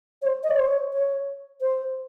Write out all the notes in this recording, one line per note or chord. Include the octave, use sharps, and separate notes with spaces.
C#5
C5
D#5
C#5
C5
C#5
C#5
C5